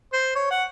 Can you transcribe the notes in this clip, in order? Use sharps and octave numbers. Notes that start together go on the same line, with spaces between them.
C5
C#5
F#5